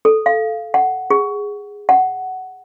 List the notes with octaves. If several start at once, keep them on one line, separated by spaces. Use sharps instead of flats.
A4
F5
F#5
G#4
F#5